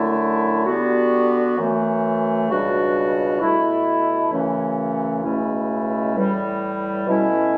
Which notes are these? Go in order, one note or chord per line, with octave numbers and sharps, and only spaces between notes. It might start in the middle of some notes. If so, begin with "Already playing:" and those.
Already playing: F#2 D3 A3 E4
D3 G3 B3 F#4
F#2 E3 A3
C#2 B2 G3 D4 F#4
B2 A3 E4
F#2 C#3 E3 A3 C#4
C#2 B2 A3 C#4 E4
A2 E3 G3
B2 A3 C#4 E4